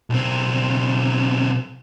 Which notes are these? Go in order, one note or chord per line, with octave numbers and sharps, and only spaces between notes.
B1 C4